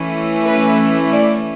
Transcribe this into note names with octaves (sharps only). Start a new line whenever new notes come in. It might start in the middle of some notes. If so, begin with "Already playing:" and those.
Already playing: E3 A3 C#4 E4
B4
D5